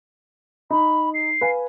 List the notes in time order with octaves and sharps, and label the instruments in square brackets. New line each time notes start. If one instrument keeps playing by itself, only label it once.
[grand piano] D#4 [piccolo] B5
[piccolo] C7
[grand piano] B4 F5 G#5